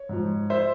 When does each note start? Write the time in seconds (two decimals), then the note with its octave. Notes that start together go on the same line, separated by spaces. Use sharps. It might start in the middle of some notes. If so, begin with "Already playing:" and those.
Already playing: C#5
0.09 G#2 F3
0.50 C5 E5